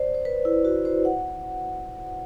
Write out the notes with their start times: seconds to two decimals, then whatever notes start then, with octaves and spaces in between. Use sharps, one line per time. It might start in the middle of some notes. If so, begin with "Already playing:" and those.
Already playing: C5 D5
0.15 C5
0.25 B4
0.45 E4
0.65 F#4
0.85 C5
1.05 F#5